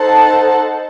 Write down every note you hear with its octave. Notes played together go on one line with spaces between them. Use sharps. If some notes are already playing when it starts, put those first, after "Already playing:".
Already playing: D#4 A4 C5 F#5 A5